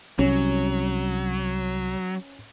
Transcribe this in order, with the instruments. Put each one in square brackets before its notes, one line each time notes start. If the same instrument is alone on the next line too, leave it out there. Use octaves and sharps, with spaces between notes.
[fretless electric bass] C2 [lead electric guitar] F#3 [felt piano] C#4